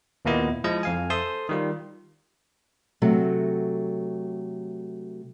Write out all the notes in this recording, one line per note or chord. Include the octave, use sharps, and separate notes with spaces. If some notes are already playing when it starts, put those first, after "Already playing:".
D#2 A#2 A#3 B3 E4 D#5
F3 G#3 E4 D#5
F2 F5 G#5
A4 C5 E5 A5 C6 D#6
D#3 G3 F4
C3 F#3 A3